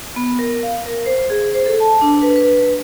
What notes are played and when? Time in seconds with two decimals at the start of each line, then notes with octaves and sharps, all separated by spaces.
0.16 B3
0.39 A#4
0.63 F5
0.86 A#4
1.06 C5
1.30 G#4
1.54 C5
1.66 A4
1.80 A5
2.01 D4
2.22 B4
2.36 B4